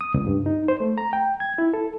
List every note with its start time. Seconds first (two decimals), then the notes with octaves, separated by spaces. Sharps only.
0.01 D#6
0.14 C#2
0.27 G2
0.46 D#4
0.68 C5
0.80 A3
0.98 A#5
1.13 G5
1.40 G#6
1.58 E4
1.74 A4